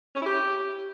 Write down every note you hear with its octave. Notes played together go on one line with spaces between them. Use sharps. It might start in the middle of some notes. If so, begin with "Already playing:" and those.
C#4
E4
G4